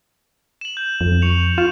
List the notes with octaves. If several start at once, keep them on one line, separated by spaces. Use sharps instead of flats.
E7 F#7
G6
F2
C#6 C#7 F7
F4 E7